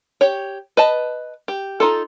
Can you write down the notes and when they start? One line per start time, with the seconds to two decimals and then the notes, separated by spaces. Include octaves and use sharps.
0.21 G4 C#5
0.77 B4 D#5 A5
1.48 G4
1.80 D#4 F4 A4